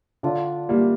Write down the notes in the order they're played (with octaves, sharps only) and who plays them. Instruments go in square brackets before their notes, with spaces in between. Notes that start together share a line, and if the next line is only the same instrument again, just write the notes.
[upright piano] D3 [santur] D4 F4
[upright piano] G3 A#3